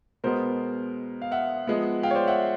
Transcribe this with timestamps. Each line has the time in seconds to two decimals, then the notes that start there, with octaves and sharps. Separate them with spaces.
0.24 B2 G#3 B3 A#4 C5
1.22 F5
1.31 E5 F#5
1.67 F3 G#3 B3
2.03 F5 G5
2.11 C#5
2.15 C5 D5
2.27 E5 F#5